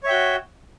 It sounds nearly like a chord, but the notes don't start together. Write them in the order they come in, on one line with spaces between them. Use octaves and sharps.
C#5 E5 G5 F#4